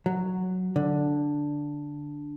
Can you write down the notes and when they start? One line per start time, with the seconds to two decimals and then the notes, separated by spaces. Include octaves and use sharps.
0.06 F#3
0.76 D3